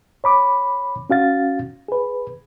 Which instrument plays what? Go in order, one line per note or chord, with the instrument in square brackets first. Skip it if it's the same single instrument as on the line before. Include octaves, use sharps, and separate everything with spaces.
[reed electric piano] C#5 B5 D6
C#4 F#4 F5 A6
G#4 B4